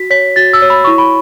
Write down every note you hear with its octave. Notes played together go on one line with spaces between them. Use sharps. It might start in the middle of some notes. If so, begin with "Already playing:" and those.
Already playing: F#4 B6
C#5 B6
F#4 A6
E6
C#5
B5
E4 C#6
B5